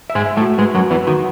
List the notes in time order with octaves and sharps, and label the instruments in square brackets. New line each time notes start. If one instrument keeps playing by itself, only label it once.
[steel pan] E5
[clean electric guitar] G#2 G#3
[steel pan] E5
[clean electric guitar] A2 A3
[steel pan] F#4
[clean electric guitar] G#2 G#3 [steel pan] B4
[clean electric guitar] F#2 F#3 [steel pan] F#4
[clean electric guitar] E2 E3 [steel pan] B4
[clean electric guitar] D#3 [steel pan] F#4